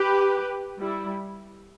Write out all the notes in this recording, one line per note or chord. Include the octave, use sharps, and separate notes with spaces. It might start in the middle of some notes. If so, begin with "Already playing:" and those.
Already playing: G4 B4
G3 E4